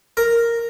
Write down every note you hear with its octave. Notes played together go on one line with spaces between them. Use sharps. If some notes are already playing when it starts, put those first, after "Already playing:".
A#4